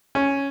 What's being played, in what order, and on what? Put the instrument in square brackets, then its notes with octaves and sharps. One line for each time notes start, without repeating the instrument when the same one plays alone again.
[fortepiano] C#4